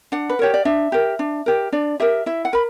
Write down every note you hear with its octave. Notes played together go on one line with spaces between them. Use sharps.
D4 F#5
B4
G4 A#4 C#5
D5
D4 E5
G4 A#4
D4
G4 A#4
D4 D5
G4 A#4 E5
E4 E5
F#5
A#4 B5